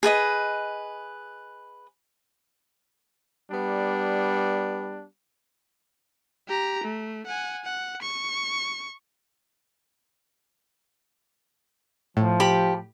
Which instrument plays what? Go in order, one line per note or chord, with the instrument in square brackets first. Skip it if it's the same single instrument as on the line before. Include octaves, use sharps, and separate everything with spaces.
[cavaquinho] G#4 B4 D#5 B5
[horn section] G3 B3 D4
[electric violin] G4 A#5
A3
F#5 G#5
F#5
C#6
[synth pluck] A2 [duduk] F3
[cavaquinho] G4 B5